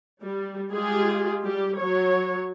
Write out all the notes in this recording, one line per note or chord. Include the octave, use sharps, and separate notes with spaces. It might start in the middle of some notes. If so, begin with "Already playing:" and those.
G3
G#3 F4 G4 G#4
G3 G4
F#3 C#5